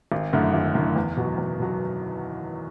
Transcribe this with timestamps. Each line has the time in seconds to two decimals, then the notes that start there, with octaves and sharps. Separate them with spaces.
0.12 G#1
0.33 F#2 D3 A3 E4
0.54 G#1
0.75 F#2 D3 A3 E4
0.96 E2
1.17 B2 F#3
1.38 E2
1.59 B2 F#3